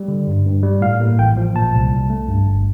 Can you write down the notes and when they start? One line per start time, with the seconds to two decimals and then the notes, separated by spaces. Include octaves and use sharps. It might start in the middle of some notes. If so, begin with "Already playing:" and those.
Already playing: G3
0.08 D3
0.27 G2
0.46 G2
0.63 G3
0.81 A2 F5
1.00 A#3
1.19 A1 G5
1.37 F3
1.55 A#2 A5
1.74 C2
1.92 C2
2.10 A3
2.28 G2
2.46 G1